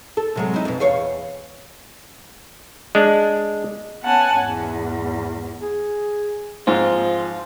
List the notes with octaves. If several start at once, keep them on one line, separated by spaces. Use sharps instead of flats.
A4
C3 F#3 G#3
D#4 E4
F2 B2
E2 C#5 F5
G#3 D4
B3 C#4 F#5 G#5 A5
E2 G#2
G#4
G#2 F3 C4 F4